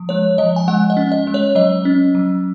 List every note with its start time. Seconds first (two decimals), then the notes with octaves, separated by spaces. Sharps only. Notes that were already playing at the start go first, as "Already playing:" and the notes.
Already playing: F3
0.09 G#3 C#5
0.38 F3 D#5
0.56 G#5
0.68 G#3 F#5
0.90 D#5
0.97 C#4
1.12 D#5
1.27 G#3
1.34 C#5
1.55 F#3 D#5
1.85 C#4
2.15 F#3